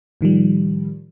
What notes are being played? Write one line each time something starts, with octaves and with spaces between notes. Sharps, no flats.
A2 D#3 F3 G3